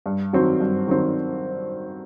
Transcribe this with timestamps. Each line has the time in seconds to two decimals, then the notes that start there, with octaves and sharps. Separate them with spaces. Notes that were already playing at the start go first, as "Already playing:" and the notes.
0.06 G2
0.33 D#3 F#3 C4
0.60 G2
0.87 D#3 F#3 C4